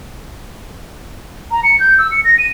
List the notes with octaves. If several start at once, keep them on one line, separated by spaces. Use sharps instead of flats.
A#5
C#7
G6
E6
C#7
A#6
D#7